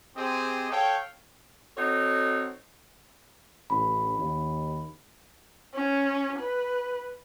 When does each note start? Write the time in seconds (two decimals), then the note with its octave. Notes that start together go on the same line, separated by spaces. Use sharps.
0.17 C4 G4 G#4 C5 D#5 D#6
0.71 A4 C#5 F5 G5
1.76 C4 D#4 F#4 A4 C#5
3.70 A1 B5
4.19 D#2
5.74 C#4
6.39 B4